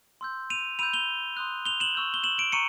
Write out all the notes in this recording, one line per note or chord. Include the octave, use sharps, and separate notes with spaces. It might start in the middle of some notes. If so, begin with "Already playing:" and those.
C6 E6 G6
D#7 F7
B5 E6 G6 D#7 F7
F7 G7
C6 D#6 F#6
F7 G7
E7 F#7
C#6 E6 G6
G7
E7 F#7
D7 E7
A#5 C#6 C#7 D#7